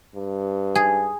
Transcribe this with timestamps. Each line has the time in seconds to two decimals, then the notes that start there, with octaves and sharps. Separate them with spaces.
0.15 G2
0.75 G#4